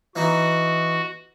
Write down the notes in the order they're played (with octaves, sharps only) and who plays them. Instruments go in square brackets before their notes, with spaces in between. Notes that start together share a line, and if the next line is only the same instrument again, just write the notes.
[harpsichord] E3 D#4 [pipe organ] F#4